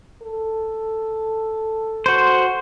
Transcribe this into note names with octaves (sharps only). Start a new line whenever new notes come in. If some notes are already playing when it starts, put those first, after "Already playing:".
A4
F#4 C5